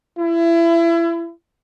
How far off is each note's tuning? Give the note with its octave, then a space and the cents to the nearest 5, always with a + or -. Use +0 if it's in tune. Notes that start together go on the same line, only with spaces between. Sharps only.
E4 +30